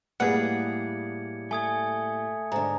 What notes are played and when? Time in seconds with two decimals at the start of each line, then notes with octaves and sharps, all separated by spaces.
0.20 A2 G3 A#3 G#4 B4 F#5 G#6 C#7
1.51 A3 G#5 D#6 G#6
2.52 G#2 D3 A#5